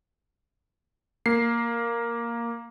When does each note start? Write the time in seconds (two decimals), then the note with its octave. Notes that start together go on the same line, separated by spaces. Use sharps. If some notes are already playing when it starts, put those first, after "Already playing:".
1.26 A#3 C7